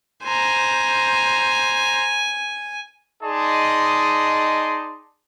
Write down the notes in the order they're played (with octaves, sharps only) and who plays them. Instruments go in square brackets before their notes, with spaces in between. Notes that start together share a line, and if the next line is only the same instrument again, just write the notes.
[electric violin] C5 A#5 [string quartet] G#5
[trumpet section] D#4 G#4 D5 D#5 A5 C6